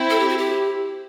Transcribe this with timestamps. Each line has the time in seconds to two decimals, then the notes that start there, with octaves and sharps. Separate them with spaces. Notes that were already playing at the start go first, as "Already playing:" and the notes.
Already playing: C4 E4
0.10 A4
0.19 G4
0.29 F#4
0.38 G4